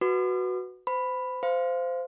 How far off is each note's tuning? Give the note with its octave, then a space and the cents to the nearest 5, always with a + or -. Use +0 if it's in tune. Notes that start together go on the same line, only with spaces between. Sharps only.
F#4 +0 B4 +0 D6 +45
C5 -30 B5 +5
C5 -15 F5 -10